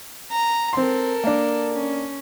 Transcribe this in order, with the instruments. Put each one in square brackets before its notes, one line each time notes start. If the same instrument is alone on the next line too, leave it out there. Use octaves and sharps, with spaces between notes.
[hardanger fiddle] A#5
[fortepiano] C4 C6 [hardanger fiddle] A4 A#4
[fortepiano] A#3 D4
[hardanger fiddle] C#4